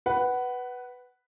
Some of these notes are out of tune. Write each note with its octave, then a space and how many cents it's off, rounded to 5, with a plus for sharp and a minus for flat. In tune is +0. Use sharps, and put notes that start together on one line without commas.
B4 +0 F#5 +20